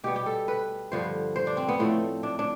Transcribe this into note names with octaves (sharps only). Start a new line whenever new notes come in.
B2 G3 B3 G4
G4
A4
B4
G2 D3 F3 B3 C5
C5
D4
C4
B3
A2 F3 A3 C4
D4
D4